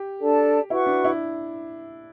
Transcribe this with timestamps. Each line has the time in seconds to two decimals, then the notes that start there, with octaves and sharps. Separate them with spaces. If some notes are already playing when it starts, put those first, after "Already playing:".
Already playing: G4
0.20 D4 A4 D5 A5
0.70 E4 F#4 B4 F#5 C#6
0.86 D4
1.05 E4